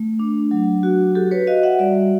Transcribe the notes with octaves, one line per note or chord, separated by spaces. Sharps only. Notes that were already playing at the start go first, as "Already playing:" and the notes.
Already playing: A3
D4
F#3
F#4
F#4 G4 A4
B4 C#5
F#4 D#5 F5
E5 F#5
G3 D5 E5